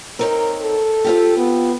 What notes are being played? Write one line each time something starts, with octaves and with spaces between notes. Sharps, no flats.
C4 D#4 A#4 C#5
A4
C4 F4 G4
B3